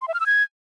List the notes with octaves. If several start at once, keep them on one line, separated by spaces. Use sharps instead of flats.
C6
E5
F6
E6
G#6